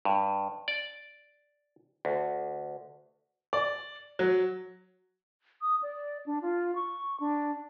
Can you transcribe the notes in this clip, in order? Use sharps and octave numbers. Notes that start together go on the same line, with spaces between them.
G2
D5
D2
D5
F#3
D#6
D5
D4
F4
C#6
D4